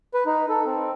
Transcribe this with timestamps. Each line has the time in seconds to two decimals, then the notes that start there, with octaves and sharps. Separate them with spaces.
0.14 B4
0.26 D#4
0.49 A4
0.66 C4